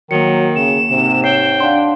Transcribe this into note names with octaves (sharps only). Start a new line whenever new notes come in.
D#3 F#3 A#3 C#7
C#3 E7
G#2 C3
C#5 G5 C7
D4 F5 F#5 C6